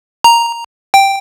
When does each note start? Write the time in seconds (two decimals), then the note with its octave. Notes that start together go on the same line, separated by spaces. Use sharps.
0.24 A#5
0.94 G5